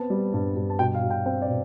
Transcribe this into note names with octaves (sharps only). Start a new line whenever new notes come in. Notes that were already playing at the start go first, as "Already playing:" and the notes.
Already playing: B3 C4 A5
G3
G2
G2
A5
B2 G5
F5
B2
G5
C4 G5
D5
B2